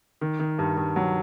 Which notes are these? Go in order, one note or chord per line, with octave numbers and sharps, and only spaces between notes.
D#3
D#3
G2
G2
F#3